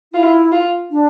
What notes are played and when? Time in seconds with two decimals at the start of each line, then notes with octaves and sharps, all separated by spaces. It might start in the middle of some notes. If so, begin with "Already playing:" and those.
0.13 E4 F4
0.52 F4
0.91 D4